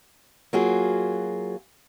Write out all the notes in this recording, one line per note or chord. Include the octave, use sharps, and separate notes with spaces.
F#3 A#3 F4 F#4 G#4